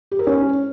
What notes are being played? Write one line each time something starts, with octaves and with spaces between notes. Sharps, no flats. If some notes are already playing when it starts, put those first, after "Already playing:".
G4
A#4
C#4